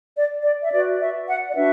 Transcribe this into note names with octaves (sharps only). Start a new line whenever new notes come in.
D5
D5
E5
F#4 B4 D5
E5
F#5
D5
D4 F#4 B4 E5